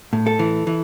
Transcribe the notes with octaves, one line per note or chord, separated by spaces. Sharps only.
A2
A4
E3
E3